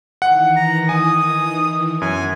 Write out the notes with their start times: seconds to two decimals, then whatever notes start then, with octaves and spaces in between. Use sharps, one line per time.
0.22 D#3 E3 F#5
0.56 A#5
0.89 G#5 D#6
2.01 F#2 B3 G#5